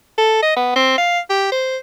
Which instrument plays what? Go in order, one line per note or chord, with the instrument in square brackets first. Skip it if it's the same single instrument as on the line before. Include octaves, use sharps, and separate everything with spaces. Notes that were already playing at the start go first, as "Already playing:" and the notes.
[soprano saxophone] A4
D#5
B3
C4
F5
G4
C5